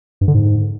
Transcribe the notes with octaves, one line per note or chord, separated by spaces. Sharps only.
G2
D3
G#2